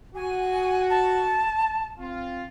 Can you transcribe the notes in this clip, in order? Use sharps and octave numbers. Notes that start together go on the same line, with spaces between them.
F#4 G#5
A5
C4 F4